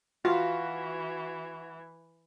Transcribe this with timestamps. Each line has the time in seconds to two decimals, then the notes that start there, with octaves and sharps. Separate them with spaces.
0.25 E3 F4 F#4 F5